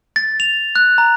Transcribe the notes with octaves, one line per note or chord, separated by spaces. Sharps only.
A6
F7
F#6
A#5